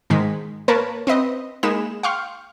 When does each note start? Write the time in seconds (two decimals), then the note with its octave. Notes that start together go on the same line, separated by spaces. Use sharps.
0.10 G#2 D#3 G#3 B6
0.68 A#3 A#4 B4 C#5 A5
1.07 C4 B4 D#5
1.63 G#3 A#3 D#4 B5 E7
2.03 F5 G5 C6 C#6 F6